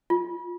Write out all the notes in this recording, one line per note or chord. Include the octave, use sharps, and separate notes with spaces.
F4